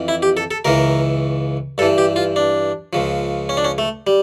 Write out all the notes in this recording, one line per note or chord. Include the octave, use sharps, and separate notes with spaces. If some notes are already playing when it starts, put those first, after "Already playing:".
Already playing: F2 E3
E4
G4
A4
A4
C#2 C#3 E3 A#4
G2 E3 A4
G4
F4
D4
C#2 C#3 F3
C#4
D4
C#4
A3
G3